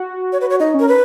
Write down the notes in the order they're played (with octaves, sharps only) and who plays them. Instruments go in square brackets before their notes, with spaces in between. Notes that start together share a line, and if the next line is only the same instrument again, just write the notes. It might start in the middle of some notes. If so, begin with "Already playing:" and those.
Already playing: [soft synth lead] F#4
[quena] C#5
B4
C#5
[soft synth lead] D#4 [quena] D#5
[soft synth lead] C#4
[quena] A#4
B4